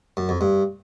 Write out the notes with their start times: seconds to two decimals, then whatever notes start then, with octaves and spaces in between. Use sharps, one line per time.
0.17 F#2
0.29 F2
0.41 G2